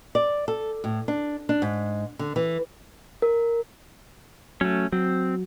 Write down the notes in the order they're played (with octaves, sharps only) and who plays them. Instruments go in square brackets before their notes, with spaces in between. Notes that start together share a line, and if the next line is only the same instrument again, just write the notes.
[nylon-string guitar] D5
A4
A2
D4
D4
G#2
D3
E3
[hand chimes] A#4
[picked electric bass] F#3 [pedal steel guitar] A3 C#4
[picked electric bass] F#3 [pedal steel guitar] C4